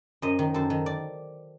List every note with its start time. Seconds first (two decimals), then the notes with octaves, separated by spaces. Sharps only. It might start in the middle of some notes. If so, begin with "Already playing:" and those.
0.22 F#2 C5 D#5
0.39 D#3
0.54 F#2 A4 C5
0.70 D#3
0.86 D5